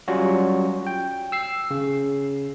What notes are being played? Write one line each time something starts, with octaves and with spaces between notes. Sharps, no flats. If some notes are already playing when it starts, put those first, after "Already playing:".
F#3 G3 C#4 F4 F#4
G5
E6 C7
C#3